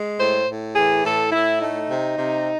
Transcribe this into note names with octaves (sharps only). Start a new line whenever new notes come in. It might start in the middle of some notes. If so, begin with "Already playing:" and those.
Already playing: G#3
A2 C5
A2
E3 G#4
A2 A4
A2 E4
A3 D#4
C3
C3